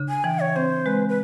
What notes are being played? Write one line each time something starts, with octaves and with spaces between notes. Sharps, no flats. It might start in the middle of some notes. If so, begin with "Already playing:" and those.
Already playing: C#3 D4
G#5
E3 G5
C#5
C4 C5
G#3 B4
B4